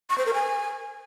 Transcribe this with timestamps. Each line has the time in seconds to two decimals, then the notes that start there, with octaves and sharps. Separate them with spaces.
0.10 C#6
0.18 C5
0.26 A#4
0.34 G#5